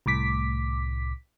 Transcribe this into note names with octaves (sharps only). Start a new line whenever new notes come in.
C2 A2 D6 B6